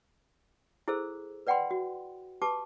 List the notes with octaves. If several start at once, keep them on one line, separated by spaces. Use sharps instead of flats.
E4 G#4 A4 C5 E6
B4 D5 F#5 G5 B5 C6
F#4
G4 B4 A5 D6